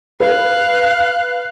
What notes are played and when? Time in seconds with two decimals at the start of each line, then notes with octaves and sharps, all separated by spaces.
0.20 B4 F5 F#6